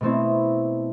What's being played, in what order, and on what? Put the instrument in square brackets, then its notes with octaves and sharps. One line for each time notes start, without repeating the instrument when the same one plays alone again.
[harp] B2 A3 C4 E4